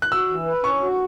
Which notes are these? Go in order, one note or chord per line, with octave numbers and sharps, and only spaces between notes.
F#6
F#4 E6
E3
B4
C#4 C#6
F#4